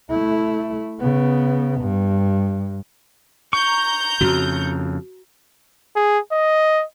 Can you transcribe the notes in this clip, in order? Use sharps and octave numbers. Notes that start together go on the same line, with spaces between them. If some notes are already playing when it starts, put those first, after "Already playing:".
A3 E4
C#3 B3
G2
A#5 C#6 G6
F2 C#3 F#4
G#4
D#5